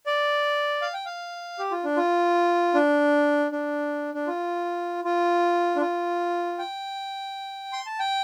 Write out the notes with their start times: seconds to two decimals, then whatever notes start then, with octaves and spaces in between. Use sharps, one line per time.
0.06 D5
0.82 F5
0.94 G5
1.06 F5
1.59 G4
1.71 F4
1.84 D4
1.97 F4
2.74 D4
3.52 D4
4.14 D4
4.27 F4
5.04 F4
5.76 D4
5.81 F4
6.59 G5
7.73 C6
7.86 A5
7.99 G5